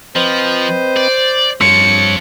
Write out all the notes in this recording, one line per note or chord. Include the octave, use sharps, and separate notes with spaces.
F3 C4 B4 C5 D#5
D5
G2 F3 C4 C#5 D6 C#7